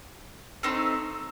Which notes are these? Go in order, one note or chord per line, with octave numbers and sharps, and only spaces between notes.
A3 C4 D#4